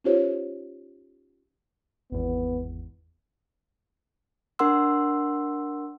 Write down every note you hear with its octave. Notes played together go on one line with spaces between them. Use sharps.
C#4 D#4 F4 G4 C5 C#5
G#1 E2 B3
D4 A#4 F#5 C6 E6